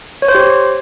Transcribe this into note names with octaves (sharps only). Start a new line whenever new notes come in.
C#5
C5
G4